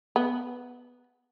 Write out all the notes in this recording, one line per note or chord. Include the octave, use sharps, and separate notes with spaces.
B3